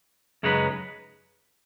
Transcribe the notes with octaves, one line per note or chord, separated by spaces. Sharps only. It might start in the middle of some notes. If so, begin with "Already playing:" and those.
F#2 C#3 G#3 D#4 B4